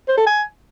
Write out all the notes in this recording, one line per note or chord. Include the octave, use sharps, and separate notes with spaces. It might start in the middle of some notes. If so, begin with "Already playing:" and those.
C5
A4
G#5